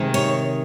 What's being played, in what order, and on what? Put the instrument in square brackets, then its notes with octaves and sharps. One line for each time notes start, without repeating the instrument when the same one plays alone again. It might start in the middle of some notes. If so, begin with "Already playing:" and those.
Already playing: [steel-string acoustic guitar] C3 D#3 G#3
C#5